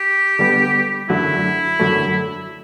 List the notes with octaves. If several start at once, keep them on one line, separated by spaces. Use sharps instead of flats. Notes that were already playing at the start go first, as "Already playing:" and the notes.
Already playing: G4
D3 G3 B3
F#2 D3 F#3 A3 E4
F#2 D3 F#3 A3